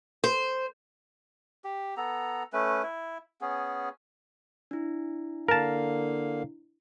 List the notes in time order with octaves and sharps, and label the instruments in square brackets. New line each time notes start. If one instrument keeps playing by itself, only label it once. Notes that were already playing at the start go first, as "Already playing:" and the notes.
[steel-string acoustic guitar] C5
[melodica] G4
B3 A4 A#5
A3 C#4 B4
E4
B3 C#4 G#4
[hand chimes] D4 E4
[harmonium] D3 A#3 F5 [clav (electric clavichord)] A#4 A5